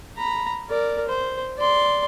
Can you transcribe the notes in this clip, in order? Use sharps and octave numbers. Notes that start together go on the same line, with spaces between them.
A#5 B5
A#4 D5
C5
D5 C6